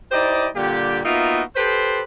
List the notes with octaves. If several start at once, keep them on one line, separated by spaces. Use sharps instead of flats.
D#4 E4 G4 C5 D5 D#5
A#2 D3 G3 A#3 G4
A#3 B3 D#4 F4 F#4 E5
G4 A4 B4 C5